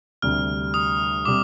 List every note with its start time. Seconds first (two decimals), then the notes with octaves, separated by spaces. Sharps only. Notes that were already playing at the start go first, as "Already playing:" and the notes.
0.22 D2 C3 G3 D4 F6
0.74 D#6
1.25 C3 G3 D6